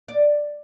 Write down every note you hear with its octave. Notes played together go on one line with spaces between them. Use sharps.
D5